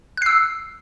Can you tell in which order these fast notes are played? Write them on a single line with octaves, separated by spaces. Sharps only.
F#6 C7 E6